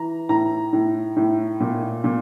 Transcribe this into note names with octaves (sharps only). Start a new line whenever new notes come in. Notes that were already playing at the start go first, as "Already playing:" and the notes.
Already playing: E3 A#5
A2 A#5
A2
A2
A#2
A#2